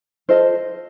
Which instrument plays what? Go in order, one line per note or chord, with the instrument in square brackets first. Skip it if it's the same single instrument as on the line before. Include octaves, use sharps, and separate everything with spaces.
[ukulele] F4 A4 C5 D#5